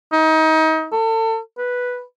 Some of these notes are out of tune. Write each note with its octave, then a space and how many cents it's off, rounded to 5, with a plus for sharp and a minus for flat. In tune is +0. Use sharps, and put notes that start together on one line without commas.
D#4 +30
A4 +35
B4 -5